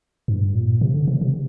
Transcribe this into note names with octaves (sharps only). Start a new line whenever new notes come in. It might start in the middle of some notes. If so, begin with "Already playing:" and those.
G2
A#2
C3
D3
C3
C3